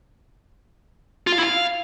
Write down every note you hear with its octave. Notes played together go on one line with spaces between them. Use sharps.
F4
F5
E4
F5